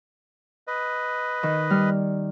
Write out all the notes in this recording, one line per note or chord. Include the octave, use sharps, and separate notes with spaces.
B4 D#5
D#3
G3 F6